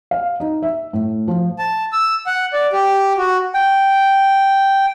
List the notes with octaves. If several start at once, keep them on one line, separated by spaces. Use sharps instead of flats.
F5
D#4
E5
A2
F3
A5
E6
F#5
D5
G4
F#4
G5